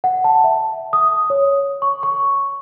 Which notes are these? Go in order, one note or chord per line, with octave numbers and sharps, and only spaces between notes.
F#5
A5
E5
D#6
C#5
C#6
C#6